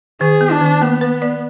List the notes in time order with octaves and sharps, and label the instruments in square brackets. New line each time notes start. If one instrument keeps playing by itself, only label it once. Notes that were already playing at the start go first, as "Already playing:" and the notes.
[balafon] D#3 [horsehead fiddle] G#4
[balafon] B3
[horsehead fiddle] D4
[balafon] D#3
[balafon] A#3 [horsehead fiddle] B3
[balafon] B4
D5